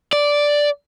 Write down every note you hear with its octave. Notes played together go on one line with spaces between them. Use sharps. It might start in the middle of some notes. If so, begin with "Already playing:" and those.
D5